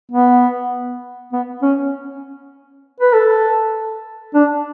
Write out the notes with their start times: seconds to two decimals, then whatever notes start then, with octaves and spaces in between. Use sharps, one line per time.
0.12 B3
1.32 B3
1.63 C#4
3.00 B4
3.13 A4
4.34 D4